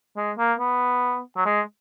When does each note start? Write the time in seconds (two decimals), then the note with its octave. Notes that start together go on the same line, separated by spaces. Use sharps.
0.16 G#3
0.38 A#3
0.59 B3
1.36 F#3
1.45 G#3